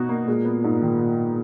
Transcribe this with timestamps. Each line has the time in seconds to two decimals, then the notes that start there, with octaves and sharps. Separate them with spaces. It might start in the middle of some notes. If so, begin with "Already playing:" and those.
Already playing: B2 D#4 F#4
0.09 A#3
0.27 A#2 G#3
0.45 B3
0.64 G#2
0.82 D#3